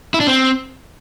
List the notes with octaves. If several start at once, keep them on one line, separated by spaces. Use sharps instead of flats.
E4
D4
C4